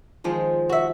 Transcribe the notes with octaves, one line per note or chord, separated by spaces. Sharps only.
D#3 F3 G#3
F#4 E5